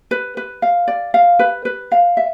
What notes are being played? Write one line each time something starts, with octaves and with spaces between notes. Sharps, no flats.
B4
B4
F5
D5
F5
B4
B4
F5
E5